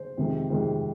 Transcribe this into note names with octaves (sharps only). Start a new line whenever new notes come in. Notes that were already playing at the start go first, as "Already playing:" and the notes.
Already playing: C5
F2 C3 D#3 G#3
F2 C3 D#3 G#3